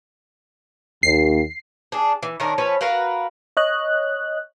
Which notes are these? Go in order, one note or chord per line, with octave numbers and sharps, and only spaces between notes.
D#2 C7
D4 G#4
E3
D#3 C#4 D4 A#4
F3 C#4 B4 C#5
F#4 A#4 B4 F5
C#5 D#5 F#6